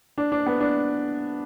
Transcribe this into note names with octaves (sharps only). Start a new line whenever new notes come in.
D4
D4
B3
D4